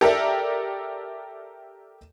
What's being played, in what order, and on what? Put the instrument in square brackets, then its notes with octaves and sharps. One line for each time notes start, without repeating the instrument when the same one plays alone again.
[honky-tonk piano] G4 A4 A#4 D5 E5